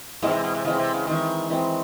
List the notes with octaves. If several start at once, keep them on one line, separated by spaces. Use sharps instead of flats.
G#2 E3 G#3 C4
C3
B2
C3
C#3 E3 G#3 C4
C3
C#3
D#3 E3 G#3 C4
E3 G#3 C4